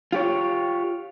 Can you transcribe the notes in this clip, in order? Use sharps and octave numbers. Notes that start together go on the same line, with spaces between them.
F4 G4 C#5